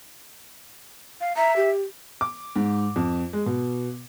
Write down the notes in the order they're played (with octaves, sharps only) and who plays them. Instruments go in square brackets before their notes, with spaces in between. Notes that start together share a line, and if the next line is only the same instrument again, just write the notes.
[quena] F5
[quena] E5 [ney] A#5
[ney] G4
[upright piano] D6
G#2
F2
G#3
B2